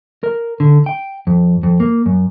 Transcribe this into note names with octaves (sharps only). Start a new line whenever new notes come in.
A#4
D3
G5
F2
F2
A#3
F#2